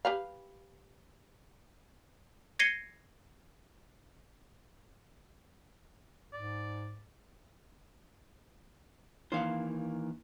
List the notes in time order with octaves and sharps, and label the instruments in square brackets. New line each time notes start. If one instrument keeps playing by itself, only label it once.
[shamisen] G4 B4 F5
[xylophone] G#6 A#6 C7 C#7 D#7 G7
[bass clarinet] G#2 [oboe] D5
[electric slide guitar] D#3 E3 A#3 [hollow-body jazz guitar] C5 F5 F#5